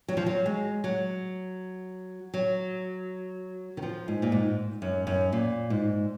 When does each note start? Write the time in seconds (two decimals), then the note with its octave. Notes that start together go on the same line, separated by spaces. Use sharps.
0.08 F#3
0.17 F3
0.26 F#3
0.46 G#3
0.84 F#3
2.34 F#3
3.77 D#3
3.82 F3
4.08 G#2
4.22 A#2
4.32 G#2
4.82 F#2
5.07 F#2
5.32 A#2
5.70 G#2